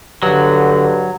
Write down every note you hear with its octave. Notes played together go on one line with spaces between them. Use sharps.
G2 D3 F#3